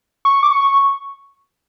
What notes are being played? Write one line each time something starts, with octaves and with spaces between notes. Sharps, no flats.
C#6
D6
C#6